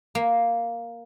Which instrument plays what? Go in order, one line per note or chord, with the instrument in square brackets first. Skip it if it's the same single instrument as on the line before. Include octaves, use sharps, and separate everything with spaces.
[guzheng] A#3